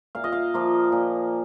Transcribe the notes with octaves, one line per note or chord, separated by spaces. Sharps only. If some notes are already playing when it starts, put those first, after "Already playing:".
A#2 F5
D#5
F5
F3 A#3
A#2